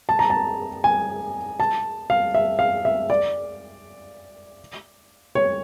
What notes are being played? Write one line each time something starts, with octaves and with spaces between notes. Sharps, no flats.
A5
A#5
A5
G#5
A5
F5
E5
F5
E5
D5
C#5